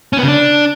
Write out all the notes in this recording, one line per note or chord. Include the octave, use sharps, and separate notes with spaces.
C#4
B3
C#3
D4